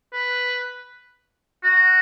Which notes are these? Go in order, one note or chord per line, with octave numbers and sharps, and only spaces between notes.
B4
F#4